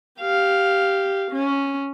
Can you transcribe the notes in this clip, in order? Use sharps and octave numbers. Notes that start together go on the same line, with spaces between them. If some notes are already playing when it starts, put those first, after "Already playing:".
G4 F5
C#4